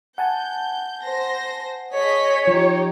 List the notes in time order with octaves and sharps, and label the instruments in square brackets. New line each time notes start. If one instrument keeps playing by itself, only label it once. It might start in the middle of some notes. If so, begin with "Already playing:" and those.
[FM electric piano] F#5 G#5 A5 [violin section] G6
[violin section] C5 A#6
[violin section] G#4 D#5 B6 [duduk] C#5
[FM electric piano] F3 [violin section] D#4 G4